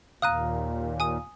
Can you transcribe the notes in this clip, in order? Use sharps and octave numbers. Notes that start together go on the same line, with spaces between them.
D#2 A#2 F5 A#5 D#6 F#6 D#7
G#5 D#6 D#7